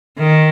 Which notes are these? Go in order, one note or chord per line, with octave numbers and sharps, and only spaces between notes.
D#3